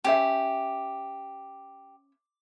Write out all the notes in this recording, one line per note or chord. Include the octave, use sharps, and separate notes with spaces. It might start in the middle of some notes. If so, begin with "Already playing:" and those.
C#4 G4 C5 E5